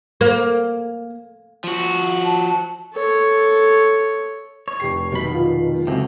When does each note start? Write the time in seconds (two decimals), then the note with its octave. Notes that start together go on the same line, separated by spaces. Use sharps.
0.21 A#3
1.64 F3 F#4
2.25 A5
2.93 A4 C#5
4.68 C#5
4.80 F1 G4 C7
5.12 B2 D#3 F#3 B5
5.34 F4
5.87 C#2 A2 F#3 C4